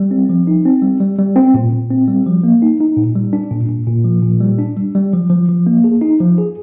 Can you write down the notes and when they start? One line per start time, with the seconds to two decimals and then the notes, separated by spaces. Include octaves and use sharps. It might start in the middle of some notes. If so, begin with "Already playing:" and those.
Already playing: G3
0.11 C4
0.29 F3
0.47 D#4
0.65 C4
0.82 G3
1.00 G3
1.19 G3
1.36 C4
1.54 A#2
1.72 A#2
1.90 C4
2.08 G3
2.27 F3
2.43 A#3
2.62 D#4
2.80 D#4
2.97 A#2
3.16 G3
3.33 D4
3.51 A#2
3.69 A#2
3.87 A#2
4.04 F3
4.23 A#2
4.40 G3
4.59 D4
4.77 G3
4.95 G3
5.13 F3
5.30 F3
5.48 F3
5.67 A#3
5.84 G#4
6.01 D#4
6.21 F3
6.38 G#4